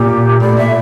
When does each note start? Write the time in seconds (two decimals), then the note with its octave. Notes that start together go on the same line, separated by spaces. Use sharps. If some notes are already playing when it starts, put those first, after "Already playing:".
Already playing: A#2 G4
0.40 A2 D5
0.57 A#2 E5